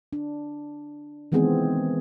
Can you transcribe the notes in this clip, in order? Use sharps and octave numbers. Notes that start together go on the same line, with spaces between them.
D4
D#3 E3 G#3 B3 C4 G#4